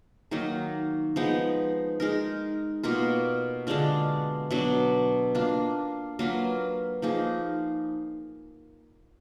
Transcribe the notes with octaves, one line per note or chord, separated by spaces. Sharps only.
D#3 F#3 A#3 D#4
F3 G#3 B3 D#4
G#3 D#4 A#4
B2 A#3 F4 A#4
D3 G#3 D4 F4
B2 F#3 D4
A#3 D4 F4
F#3 A#3 F4 B4
F3 A#3 D#4 G#4